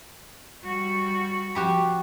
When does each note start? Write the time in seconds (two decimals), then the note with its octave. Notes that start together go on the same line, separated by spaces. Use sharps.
0.64 G3 F#4
1.55 F3 F#4 G4 B5